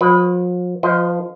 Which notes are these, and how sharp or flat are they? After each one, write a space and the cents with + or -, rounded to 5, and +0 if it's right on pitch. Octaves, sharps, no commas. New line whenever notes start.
F3 +40 B4 +0
F3 +5 C5 -35 D#5 +0